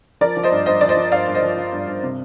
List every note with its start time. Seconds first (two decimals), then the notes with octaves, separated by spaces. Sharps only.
0.21 F3 A#4 D5
0.37 F3
0.43 C5 D#5
0.51 G2
0.66 G2 C5 D#5
0.81 F3 D5
0.89 C5 D#5
0.97 F3
1.12 G2 D5 F5
1.27 G2
1.35 C5 D#5
1.43 F3
1.57 F3
1.72 G2
1.87 G2
2.03 C3